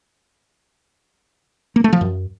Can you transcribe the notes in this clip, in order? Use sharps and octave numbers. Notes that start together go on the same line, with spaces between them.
A#3
A3
F3
F#2